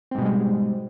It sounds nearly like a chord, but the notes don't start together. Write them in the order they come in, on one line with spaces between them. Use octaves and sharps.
C4 G#2 B2 G3 G#3